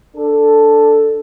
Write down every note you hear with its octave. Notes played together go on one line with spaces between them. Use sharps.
D4 A4